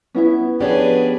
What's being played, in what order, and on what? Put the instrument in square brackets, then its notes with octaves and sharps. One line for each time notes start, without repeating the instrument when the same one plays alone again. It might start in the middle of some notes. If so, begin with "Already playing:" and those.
[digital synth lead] B3 [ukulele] C#4 E4 E5
[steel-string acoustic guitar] F3 D4 G4 [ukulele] C#4 C#5 D5 [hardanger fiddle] G#4 B4